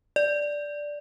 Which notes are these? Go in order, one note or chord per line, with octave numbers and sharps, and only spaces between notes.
D5